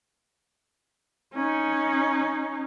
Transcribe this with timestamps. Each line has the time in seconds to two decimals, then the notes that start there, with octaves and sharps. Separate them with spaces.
1.34 C#4 D#4